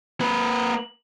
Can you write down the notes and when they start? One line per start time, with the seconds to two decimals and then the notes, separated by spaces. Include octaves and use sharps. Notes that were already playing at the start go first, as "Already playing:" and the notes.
0.21 A#3 B4